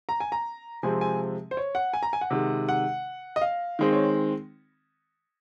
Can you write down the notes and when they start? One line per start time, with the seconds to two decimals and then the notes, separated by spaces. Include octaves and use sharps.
0.09 A#5
0.20 G#5
0.32 A#5
0.83 C3 F3 G#3 C4 G#5
1.01 G#5
1.51 C5
1.57 C#5
1.75 F#5
1.93 G#5
2.03 A#5
2.13 G#5
2.21 F#5
2.30 C3 D#3 G#3
2.69 F#5
3.36 D#5
3.41 F5
3.79 D#3 G#3 C4
3.93 C#5